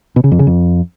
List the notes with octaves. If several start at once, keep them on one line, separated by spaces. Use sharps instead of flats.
B2
C#3
F2
C#3
F2